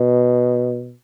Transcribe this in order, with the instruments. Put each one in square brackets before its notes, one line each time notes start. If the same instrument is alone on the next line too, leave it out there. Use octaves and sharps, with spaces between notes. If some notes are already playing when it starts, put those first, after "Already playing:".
Already playing: [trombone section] B2